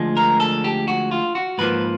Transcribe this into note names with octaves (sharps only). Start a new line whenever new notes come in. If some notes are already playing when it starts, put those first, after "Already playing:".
Already playing: D2 F3 G#3
A#4
A4
G4
F#4
F4
F#4
G#2 F3 A#3 B4